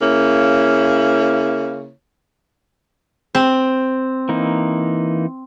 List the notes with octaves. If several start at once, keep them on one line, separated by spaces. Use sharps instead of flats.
C#3 A#3 E4 C#5
C4
E3 A#3 D#4